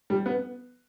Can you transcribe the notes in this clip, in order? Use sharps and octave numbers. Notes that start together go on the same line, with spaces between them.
G3
B3